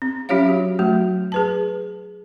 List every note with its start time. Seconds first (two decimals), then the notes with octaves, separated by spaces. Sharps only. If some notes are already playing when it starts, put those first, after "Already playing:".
0.02 C4
0.29 F#3 C#4 F4 G4 C#5 F5
0.49 F#4
0.79 F#3 A3 F#4
1.32 G#4 B4 A5